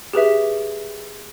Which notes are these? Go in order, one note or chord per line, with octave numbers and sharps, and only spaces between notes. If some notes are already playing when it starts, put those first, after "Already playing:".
G4 G#4 B4 E5